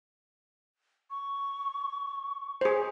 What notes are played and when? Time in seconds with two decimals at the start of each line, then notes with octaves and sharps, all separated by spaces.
1.10 C#6
2.61 G#4 C5